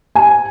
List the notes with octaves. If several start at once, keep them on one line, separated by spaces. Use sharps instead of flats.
G#5